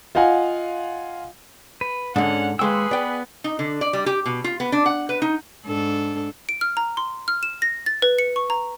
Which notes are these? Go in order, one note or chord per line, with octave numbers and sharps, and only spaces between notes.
F4 D#5 F5 F#5 G#5
B4
G#2 D3 C#4 D4 F#5
D#2 G#3 G#4 B4 G5 C6 C#6 E6
B3 D5 G5
D#4
D3
D5
G3
G4
B2
F4
B3
D4
F#5
B4
D#4
G#2 D4 A4
D7
F6
A#5
C6
F6
E7
A#6
A6
B4
C#7
C#6
A#5